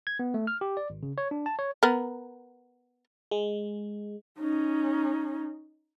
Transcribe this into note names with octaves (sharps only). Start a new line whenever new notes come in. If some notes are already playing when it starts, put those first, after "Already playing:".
G#6
B3
A3
F6
G4
D5
G#1
C#3
C#5
D4
A5
C#5
B3 A#4
G#3
C#4 D#4